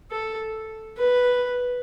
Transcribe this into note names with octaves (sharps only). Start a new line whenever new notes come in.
A4
B4